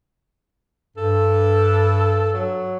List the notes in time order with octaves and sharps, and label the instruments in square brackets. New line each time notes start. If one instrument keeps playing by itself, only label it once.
[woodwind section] G2 [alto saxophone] A4
[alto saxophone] F#3